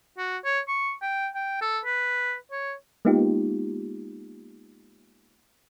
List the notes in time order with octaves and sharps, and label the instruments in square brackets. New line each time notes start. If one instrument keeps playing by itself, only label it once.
[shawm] F#4
C#5
C#6
G5
G5
A4
B4
C#5
[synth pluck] G#3 A#3 B3 D#4 F4 G4